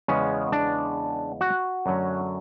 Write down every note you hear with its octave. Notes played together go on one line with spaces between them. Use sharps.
E2 C#3 G#3 B3 C#4
D4
F#4
F#2 D3 F#3 A3 C#4